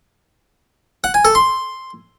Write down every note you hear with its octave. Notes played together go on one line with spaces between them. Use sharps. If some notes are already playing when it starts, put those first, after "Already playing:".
F#5
G#5
A4
C6